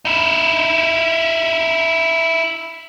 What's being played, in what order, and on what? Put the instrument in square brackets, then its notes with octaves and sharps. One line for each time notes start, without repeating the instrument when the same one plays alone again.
[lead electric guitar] D#4 E4